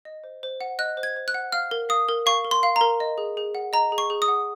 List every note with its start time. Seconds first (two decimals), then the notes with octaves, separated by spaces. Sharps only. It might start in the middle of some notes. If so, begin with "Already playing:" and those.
0.05 D#5
0.24 C5
0.43 C5
0.61 F#5
0.79 D#5 F#6
0.97 C5
1.03 G#6
1.16 C5
1.28 F#6
1.34 F#5
1.52 F5 F6
1.71 A#4
1.89 F5 D#6
2.09 A#4
2.26 F5 C#6
2.45 A#4
2.51 C6
2.63 F5
2.76 A#5
2.81 A#4
3.00 D#5
3.18 G#4
3.37 G#4
3.55 F#5
3.73 D#5 A#5
3.92 G#4
3.98 C#6
4.10 G#4
4.22 D#6
4.28 F#5